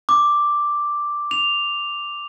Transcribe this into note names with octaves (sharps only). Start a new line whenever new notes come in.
D6
F7